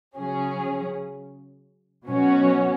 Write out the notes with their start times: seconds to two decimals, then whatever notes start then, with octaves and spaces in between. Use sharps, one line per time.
0.17 C#3 F#3 C#4 G#4
2.07 B2 F#3 C#4 F#4